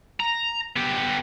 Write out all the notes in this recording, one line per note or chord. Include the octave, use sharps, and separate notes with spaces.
A#5
B3 G4